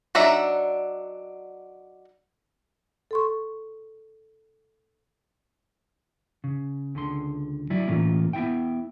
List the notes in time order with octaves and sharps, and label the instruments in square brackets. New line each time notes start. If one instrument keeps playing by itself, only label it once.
[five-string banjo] F#3 D4 D#4 E5 A#5
[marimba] A4 C6 C#6
[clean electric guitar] C#3
C#2 D3 C6
F#3 E4 D5
A2 E3 A#3 C#4 F4
B3 E4 E5 G5